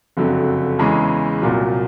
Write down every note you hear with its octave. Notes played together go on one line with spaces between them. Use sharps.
F#1 F2 D3 F#3
E2 C#3 E3 G#3
C2 A#2 F#3